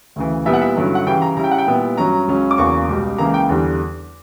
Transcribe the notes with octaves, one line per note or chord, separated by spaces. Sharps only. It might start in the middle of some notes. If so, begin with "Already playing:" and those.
D2 C#3 E3
A#2 G3 B3 E4 E5
F#5
E5
G2 D3 F#3 C#4 E4
F#5
C#3 E3 G3 G5
A#5
C#3 G3 C#4 E4 A#5
G5
F#5
G5
A#2 G3 B3 E4
G2 F#3 C#4 A#5
C#2 C#3 F#3 C#4
D6
E2 C#3 F#3 A#3 C#6
C#2 B2 G3
C#2 C#3 E3 A#3 A#5
G5
E2 D3 G3